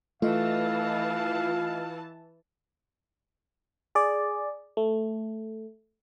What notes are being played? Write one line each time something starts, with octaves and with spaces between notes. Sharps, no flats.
E3 A3 F4 D#5 F5 A5
G#4 D5
A3